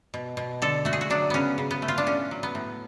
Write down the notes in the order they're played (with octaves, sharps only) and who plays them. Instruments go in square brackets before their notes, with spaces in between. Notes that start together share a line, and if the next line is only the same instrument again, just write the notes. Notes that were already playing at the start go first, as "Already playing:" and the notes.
[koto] B2
B2
D3 A4
A3 F#4
G#4
F#4
F#3 D4
C#3 B3 C#4
C#3
B3
A3
F4
D4
A2 C#4
F#3
B3
A2